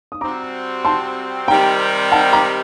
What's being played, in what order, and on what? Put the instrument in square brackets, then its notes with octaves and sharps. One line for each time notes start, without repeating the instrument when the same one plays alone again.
[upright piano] D#6
[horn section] C3 G3 C4 F#4 [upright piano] A#5 D6
[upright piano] A5 C6
[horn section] C3 D#3 G3 C4 D#4 [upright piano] G5 A#5
[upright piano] F#5 A5
A#5 D6